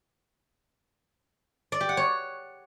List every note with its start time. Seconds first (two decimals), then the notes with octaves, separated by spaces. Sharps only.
1.72 D5
1.81 G4
1.89 F#5
1.97 C#5